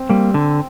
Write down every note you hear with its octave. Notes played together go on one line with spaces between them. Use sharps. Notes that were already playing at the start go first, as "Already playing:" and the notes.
Already playing: C4
G3 A#3
D3